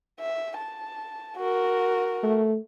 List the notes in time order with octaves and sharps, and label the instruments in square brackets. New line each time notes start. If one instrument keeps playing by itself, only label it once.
[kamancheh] E5
A5
F#4 A#4
[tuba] A3